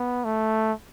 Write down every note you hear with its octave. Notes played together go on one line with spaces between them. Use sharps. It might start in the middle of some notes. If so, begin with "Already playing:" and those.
Already playing: B3
A3